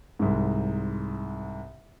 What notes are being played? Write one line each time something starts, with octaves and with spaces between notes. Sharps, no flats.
C2 G#2